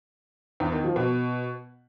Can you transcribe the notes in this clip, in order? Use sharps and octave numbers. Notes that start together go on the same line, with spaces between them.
E2
D#3
F3
B2